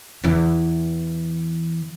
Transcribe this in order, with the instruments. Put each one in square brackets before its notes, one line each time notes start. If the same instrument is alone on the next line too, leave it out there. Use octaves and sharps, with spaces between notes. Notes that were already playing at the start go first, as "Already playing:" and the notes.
[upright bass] E2 E3